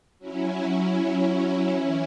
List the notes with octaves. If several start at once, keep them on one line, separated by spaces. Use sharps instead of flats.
F#3 C#4 E4
E3 C#4 E4